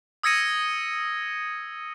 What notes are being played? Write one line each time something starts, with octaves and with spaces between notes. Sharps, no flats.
D#6 E6 G#6 A#6 C#7 D#7